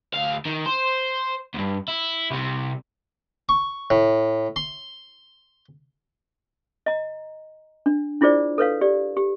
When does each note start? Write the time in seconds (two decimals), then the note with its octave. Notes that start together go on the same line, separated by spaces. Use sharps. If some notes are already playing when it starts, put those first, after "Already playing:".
0.14 D2 F5
0.45 D#3
0.66 C5
1.54 D2 G2
1.88 E4
2.30 C2 C3
3.49 C#6
3.90 A2
4.56 C6
6.86 D#5 A#5
7.86 D4
8.21 D4 E4 F4 G#4 C5 D5
8.58 A4 B4 C#5 F5
8.81 G4 D5
9.17 G4